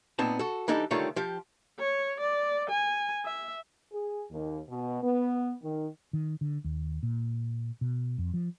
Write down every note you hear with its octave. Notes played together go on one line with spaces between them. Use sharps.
A#2 B3 C4 D#4 A5
F#4 A4
E3 G3 D4 D#4 A4
D3 D#3 G3 A3 F4 C#5
F3 G4
C#5
D5
G#5
E5
G#4
D#2
B2
B3
D#3
D#3
D3
D#2
A#2
B2
F2
F3